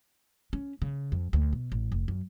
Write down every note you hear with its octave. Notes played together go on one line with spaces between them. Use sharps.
C#4
C#3
F2
D2
B2
A1
F1
F#2